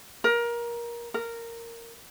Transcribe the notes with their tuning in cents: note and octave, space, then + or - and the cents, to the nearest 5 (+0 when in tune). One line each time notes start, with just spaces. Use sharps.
A#4 +20
A#4 -10